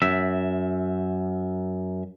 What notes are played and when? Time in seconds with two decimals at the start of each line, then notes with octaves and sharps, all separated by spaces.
0.02 F#2 E5